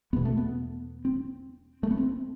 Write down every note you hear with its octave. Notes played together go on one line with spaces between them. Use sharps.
E2 B2 B3
A3
B3
C4
A3
B3
C4